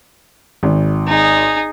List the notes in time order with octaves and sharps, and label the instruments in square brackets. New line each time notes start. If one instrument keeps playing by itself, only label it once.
[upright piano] G#1
[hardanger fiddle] D#4 G#4